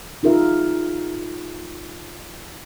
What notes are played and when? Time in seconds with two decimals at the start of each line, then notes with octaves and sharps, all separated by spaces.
0.23 D#4 F4 G#4 A#4 E5